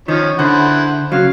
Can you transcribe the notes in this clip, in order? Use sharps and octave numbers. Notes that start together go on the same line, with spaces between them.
D#3 F3 C#4
D3 E4 C5 F#5
C#3 F#3 F5